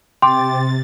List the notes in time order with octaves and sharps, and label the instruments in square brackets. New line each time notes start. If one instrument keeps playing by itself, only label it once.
[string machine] C3 A6 [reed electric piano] G5 D6 [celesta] C6